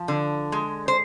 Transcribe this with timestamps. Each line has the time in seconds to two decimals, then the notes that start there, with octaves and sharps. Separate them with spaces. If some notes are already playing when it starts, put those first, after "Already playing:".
Already playing: F3
0.08 D3
0.52 G#3
0.88 C5